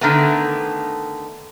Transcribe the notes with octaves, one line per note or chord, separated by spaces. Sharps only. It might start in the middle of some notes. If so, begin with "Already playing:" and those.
D3 D#3 A3 B3